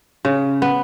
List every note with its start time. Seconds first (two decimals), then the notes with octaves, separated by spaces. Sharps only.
0.25 C#3
0.62 B3